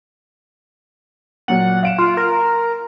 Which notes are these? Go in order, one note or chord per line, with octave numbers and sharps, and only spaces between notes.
A#2 F#3 F#5
F5 D7 E7
F4 C6 F6
A#4